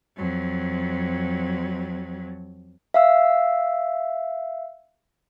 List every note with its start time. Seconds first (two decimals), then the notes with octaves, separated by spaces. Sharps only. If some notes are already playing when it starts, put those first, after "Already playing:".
0.16 F2 F#3
2.94 E5 F5 E6